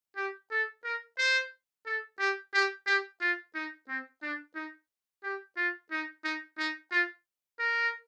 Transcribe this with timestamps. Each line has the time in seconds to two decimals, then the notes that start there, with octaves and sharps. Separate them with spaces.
0.17 G4
0.51 A4
0.84 A#4
1.18 C5
1.86 A4
2.20 G4
2.54 G4
2.87 G4
3.21 F4
3.55 D#4
3.88 C4
4.22 D4
4.55 D#4
5.24 G4
5.57 F4
5.91 D#4
6.24 D#4
6.58 D#4
6.92 F4
7.59 A#4